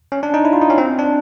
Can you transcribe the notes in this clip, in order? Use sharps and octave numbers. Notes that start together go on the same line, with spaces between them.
C#4
D4
D#4
E4
F4
D#4
C#4
C4
D4